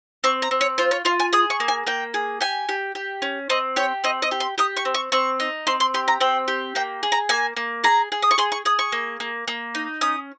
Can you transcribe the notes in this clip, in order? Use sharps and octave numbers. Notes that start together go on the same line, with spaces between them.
C4 C#6
A#5
C4
C#5
F4 C5
C#5
F4 F5
G#5
G#4 D#6
C#6
A#3
G#5
A#3 G5
G#4
G4 G#5
G4
G4
C#4
C4 D#5
G4 C#5
C4 D#5
D#5
G4
C6
G4 D#6
C#6
C4
C#6
C4 C#6
D#4
C4 C6
C6
G4 C6
A#5
C4 G5
G4
A#3 G5
G#4
A#5
A#3 G#5
A#3
G#4 A#5
G#4
D#6
C#6
G#4 C6
C#6
G#4 D#6
C#6
A#3
A#3
A#3
D#4
C#4 D#6